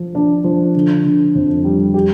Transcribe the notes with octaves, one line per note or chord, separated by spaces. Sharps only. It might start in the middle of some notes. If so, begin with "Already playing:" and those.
Already playing: F3
D4
F3
D3
D3
F2
G3
G4